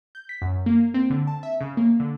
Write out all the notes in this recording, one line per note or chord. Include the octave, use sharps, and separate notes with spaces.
G6
B6
F#2
A#3
C4
D3
A5
E5
C#3
A#3
D3